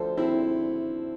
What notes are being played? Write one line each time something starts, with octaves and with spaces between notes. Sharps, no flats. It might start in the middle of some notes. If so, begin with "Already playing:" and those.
Already playing: D2 D3 F3 A4 C5
C4 E4